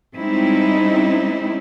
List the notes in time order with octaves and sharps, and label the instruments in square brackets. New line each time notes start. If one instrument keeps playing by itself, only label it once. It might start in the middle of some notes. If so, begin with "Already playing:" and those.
[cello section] G3 G#3 C4 C#4 D#4 E4